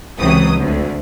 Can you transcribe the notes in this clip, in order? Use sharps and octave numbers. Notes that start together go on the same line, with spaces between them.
C#2 C3 E3 F#3 D#6
D2 D3